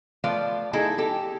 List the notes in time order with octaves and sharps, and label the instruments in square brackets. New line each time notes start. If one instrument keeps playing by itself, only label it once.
[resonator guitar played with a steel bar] F3 A3 B4 D5 F5
A3 D#4 E4 G#4 A4
G4 A4